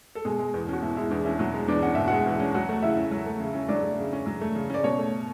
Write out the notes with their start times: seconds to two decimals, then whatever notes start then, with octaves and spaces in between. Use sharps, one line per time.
0.15 A4
0.25 B2 G#3 G#4
0.39 G#3
0.54 E2
0.69 C#4 F#4
0.82 B2 E4
0.96 G#3 E4
1.11 E2 D4
1.25 C#4 E4
1.39 B2 F#3 F#4
1.54 G#3
1.68 E2 D4 D5
1.83 C#4 F#5
1.95 B2 E5
2.07 G#3 F#4 F#5
2.26 E2
2.40 C#4
2.54 F#3 F#4 F#5
2.69 A3
2.83 C#3 E4 E5
2.97 C#4
3.12 F#3
3.26 A3
3.40 C#3
3.55 C#4
3.68 F#3 D4 D5
3.83 A3
3.98 C#3
4.13 C#4
4.26 F#3
4.41 A3
4.55 C#3
4.70 C#4 D5
4.83 B2 C#4 C#5
4.98 A3